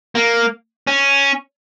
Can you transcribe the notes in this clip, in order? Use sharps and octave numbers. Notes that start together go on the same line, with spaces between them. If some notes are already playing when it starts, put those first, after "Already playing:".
A#3
C#4